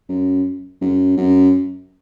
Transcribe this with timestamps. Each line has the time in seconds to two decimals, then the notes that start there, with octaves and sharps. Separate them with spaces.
0.09 F#2
0.82 F#2
1.17 F#2